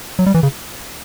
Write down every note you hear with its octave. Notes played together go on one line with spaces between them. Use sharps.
F#3
G3
E3
C#3